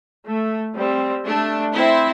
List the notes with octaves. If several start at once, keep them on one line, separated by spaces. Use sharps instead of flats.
A3
G3 C4
A3 D4
C4 E4